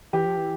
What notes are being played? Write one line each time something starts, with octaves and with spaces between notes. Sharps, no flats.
E3 G4
F3
E3